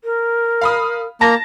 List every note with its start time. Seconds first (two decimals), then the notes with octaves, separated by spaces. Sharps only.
0.04 A#4
0.61 F5 B5 D#6
1.21 A#3 A5 A#5 A#6